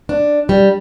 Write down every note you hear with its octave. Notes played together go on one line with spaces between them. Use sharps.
D4
G3